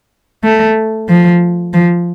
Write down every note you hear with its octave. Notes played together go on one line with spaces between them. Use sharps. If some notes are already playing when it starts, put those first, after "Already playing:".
A3
F3
F3